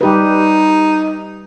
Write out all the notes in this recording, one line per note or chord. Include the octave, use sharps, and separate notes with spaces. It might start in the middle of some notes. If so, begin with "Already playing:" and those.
G3 D#4 G4 B4